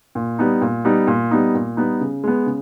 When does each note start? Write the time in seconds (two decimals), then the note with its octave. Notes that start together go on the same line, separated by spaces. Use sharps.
0.15 A#2
0.39 G3 B3 D#4
0.61 A#2
0.85 G3 B3 D#4
1.07 A#2
1.31 G3 B3 D#4
1.55 A#2
1.77 G3 B3 D#4
2.01 C#3
2.24 G#3 B3
2.46 C#3